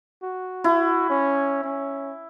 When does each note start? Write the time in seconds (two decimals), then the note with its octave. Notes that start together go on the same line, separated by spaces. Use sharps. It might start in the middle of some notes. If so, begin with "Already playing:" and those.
0.23 F#4
0.64 E4
1.10 C#4
1.64 C#4